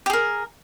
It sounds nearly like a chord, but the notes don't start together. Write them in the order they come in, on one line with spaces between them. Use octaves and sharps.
G4 G#4 A#4